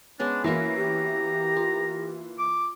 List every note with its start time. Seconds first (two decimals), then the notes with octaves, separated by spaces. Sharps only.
0.19 G#3 B3 C#4 D4
0.44 E3 A#3 F#4 E5 F5 A#5
0.76 G4
1.56 F4
2.38 D6